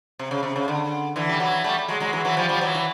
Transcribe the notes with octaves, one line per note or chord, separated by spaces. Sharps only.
C3
C#3
C3
C#3
D3
D3 E3
G3
E3 F#3
G3 A3
F#3 G#3
F#3 G#3
E3 F#3
E3 F#3
F3 G3
F3 G3
E3 F#3
E3